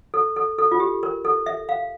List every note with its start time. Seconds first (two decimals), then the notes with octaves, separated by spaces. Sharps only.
0.14 A4
0.36 A4
0.59 A4
0.72 F4
0.80 G4
1.03 A#4
1.25 A4
1.46 E5
1.69 F5